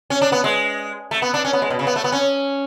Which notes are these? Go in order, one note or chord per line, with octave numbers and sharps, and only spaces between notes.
C#4
D4
B3
G#3
A3
B3
D4
C#4
B3
G#3
B2
C#3
B3
A3
B3
C#4